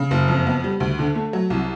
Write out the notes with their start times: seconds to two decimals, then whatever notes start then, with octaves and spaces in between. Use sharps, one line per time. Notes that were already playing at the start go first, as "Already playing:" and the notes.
Already playing: C#3
0.11 F#1
0.28 F2
0.47 B3
0.64 G3
0.80 D2
0.99 D3
1.15 A3
1.33 F#3
1.50 C2